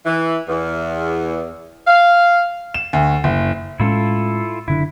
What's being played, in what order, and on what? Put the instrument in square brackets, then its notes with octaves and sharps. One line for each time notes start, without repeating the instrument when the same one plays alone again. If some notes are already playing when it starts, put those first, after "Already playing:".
[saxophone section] E3
E2
F5
[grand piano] E7
D2
F#1
[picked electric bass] A2 G#3 C#4 [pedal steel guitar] E4 F4 A4
[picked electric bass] F#1 D3 D4 [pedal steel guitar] E4